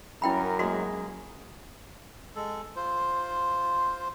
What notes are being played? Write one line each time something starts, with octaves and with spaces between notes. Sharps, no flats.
F#2 C#4 E4 A#4 G5 B5
F#3 G#3 A#3 F#4 G#4
G#3 A4
F4 C5